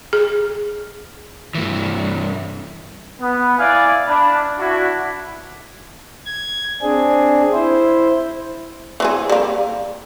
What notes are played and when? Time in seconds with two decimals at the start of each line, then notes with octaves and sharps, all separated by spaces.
0.13 G#4
1.55 G2 E3
3.20 B3
3.58 E4 D5 F5 G#5
4.07 D4 B5
4.59 D4 E4 F#4
6.26 G#6
6.82 C4 D4 G#4
7.53 E4 C5
9.00 E3 C4 G#4
9.29 G3 A#3